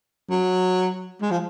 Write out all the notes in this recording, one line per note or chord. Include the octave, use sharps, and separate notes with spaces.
F#3
G#3
F3